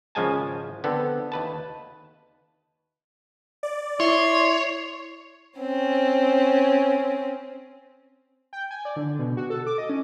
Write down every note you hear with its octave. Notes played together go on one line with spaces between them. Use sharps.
G#1 C#3 F3 G#3 G#5 A5
D3 B3 C4 A4
D#2 B4 A5
D5
E4 C#5 E5 C6
C4 C#4
G5
G#5
D5
D3
B2
F#4
A4
D6
D#5
C#4